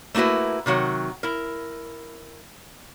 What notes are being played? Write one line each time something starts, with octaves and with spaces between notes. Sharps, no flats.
A3 A#3 E4 F#4 B4
C3 D#3 F#3 F#5
E4 A#4